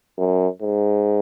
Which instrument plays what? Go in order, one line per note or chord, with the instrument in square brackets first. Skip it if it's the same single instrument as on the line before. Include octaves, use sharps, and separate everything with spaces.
[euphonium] F#2
G#2